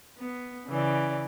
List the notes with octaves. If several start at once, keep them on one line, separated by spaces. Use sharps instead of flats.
B3
C#3 E3 D5